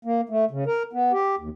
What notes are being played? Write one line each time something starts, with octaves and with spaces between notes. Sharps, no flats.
A#3
A3
C#3
A#4
B3
G4
D#2